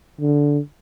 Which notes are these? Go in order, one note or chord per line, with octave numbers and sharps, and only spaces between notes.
D3